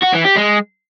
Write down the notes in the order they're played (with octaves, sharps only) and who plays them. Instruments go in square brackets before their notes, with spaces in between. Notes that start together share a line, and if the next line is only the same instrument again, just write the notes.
[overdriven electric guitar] F#4
E3
G4
G#3